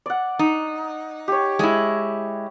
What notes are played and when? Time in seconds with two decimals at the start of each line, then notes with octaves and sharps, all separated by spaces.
0.06 D5 F#5
0.39 D#4
1.28 G4 C#5
1.59 G#3 E4